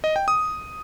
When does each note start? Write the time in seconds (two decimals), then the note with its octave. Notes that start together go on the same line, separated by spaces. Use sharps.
0.04 D#5
0.16 G5
0.28 D#6